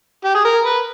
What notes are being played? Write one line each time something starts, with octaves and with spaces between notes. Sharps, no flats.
G4
G#4
A#4
B4